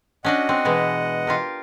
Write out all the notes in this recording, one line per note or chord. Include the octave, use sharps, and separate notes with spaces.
C#4 D4 F#4 D#5 F#5
C4
B2 E3 G#3
F4 G4 A#4